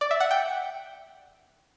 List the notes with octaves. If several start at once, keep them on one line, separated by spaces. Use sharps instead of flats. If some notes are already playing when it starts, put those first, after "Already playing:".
D5
E5
F#5
G5